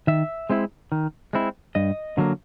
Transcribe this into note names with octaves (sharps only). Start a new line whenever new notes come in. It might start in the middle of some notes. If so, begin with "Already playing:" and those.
D#3 E5
G#3 C4 E4
D#3
G#3 C4 E4
G2 D#5
D3 F#3 A#3